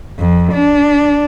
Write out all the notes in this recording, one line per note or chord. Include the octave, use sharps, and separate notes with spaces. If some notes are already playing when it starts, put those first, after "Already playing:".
F2
D4